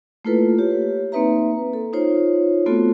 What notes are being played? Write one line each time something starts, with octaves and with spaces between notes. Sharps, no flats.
A3 A#3 E4 F4 A4 B4
G4 C#5
A#3 C4 D#4 B4 E5 A#5
A4
D#4 F4 C5 C#5
A3 B3 C4 F4 F#4 A4